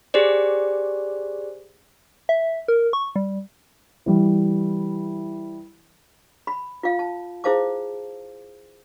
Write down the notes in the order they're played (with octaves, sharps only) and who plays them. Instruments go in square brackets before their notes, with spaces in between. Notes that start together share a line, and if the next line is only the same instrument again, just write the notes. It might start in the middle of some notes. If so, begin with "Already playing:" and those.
[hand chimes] G4 G#4 C5 D5
[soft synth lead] E5
A#4
C#6
G3
[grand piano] E3 G3
[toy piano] B5
F4 F5
A5
E4 G#4 C5 F5 A5 D6